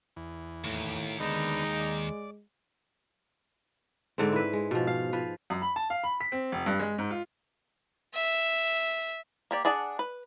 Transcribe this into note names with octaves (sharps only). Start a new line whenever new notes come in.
E2
D#2 A2
D3 G#3 B3 D#4
D5
G#2 D3 C4
E4 B4
G#3
B2 F3
F5
F3 B4
F#2
B5
A5
F5
B5
B6
C4
F1
G2
G#3
G#2
F4
E5
A#3 G4 D5
D4 G#4 D5 F#5 A5
B4